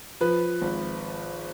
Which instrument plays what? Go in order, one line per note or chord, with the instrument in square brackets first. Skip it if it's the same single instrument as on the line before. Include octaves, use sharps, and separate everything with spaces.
[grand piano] F3 B4
G#1